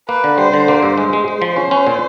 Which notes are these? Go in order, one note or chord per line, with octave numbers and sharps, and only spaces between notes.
A#3 B4
D3
G3 C5
D3
A#3
G2
G#3 C5
G#3
G#3
F3
C#4
C#4
A#2